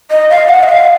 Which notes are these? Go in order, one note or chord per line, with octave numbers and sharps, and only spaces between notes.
D#5
F5
F#5
D#5
F5